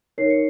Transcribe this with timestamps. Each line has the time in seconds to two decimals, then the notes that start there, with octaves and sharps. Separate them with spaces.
0.18 D#4 A#4 C#5 C7
0.30 C#7